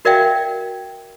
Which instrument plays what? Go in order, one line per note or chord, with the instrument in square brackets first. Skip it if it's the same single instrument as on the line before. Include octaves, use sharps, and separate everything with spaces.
[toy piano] F#4 A#4 D5 E5 F5 G5